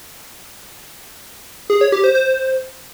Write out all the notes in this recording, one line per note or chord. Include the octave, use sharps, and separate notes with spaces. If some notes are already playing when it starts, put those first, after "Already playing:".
G#4
C#5
G4
C5
C5